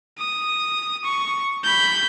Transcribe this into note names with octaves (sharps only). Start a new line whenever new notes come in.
D#6
C#6
B5 G6